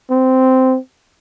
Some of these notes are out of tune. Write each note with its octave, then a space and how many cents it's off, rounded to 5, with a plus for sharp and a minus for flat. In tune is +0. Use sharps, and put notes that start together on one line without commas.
C4 -10